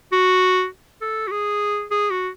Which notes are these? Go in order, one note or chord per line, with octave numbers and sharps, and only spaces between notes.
F#4
A4
F#4
G#4
G#4
F#4